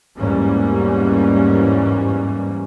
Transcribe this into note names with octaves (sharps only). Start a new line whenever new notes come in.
E2 G#2 E3 G3 A#3 C#4